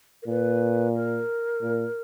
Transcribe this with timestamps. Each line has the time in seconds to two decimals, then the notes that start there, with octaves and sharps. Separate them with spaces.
0.23 A#4
0.27 A#2 B4
0.95 A#4
1.62 A#2